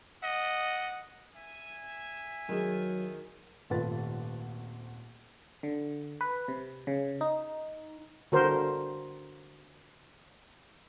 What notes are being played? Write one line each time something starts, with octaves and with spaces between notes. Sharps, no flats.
D#5 F#5
E5 G#5
D#3 F#3 G#4
D#1 G#1 A3 F4 B4 A6
D3
B4
C3
C#3
D#4
D3 F#4 A#4 C5